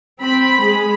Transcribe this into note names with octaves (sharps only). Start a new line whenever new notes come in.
C4 B5
G#3 G#4 B5